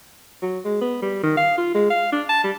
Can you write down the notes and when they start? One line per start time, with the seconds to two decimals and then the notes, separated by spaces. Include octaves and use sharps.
0.42 F#3
0.65 G#3
0.81 B3
1.02 G3
1.23 D#3
1.37 F5
1.58 F4
1.75 G#3
1.91 F5
2.12 D4
2.29 A5
2.44 G3